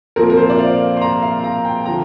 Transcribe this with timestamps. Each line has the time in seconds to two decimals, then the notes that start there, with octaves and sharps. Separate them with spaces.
0.16 A#2 F3 C4 A#4
0.30 A#4
0.37 C5
0.50 D5
0.59 F5
0.97 C6
1.01 A#5
1.23 F5
1.44 A#5
1.65 G5
1.86 D3 F3 A#5